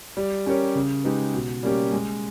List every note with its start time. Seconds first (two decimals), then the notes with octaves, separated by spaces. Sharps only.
0.17 G3
0.46 C#4 G4 A#4 C#5
0.75 C#3
1.04 G#3 D#4 G4 B4
1.34 B2
1.63 G3 A#3 C#4 G4
1.92 G#3